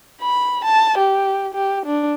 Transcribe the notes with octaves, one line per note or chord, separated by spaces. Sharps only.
B5
A5
G4
G4
D4